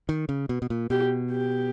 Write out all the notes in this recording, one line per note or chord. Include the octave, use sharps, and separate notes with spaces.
D#3
C#3
B2
B2
A#2
B2 G4
G4